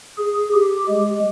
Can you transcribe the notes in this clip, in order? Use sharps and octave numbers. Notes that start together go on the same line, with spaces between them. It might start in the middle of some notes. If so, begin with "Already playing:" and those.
G#4
G4
G#3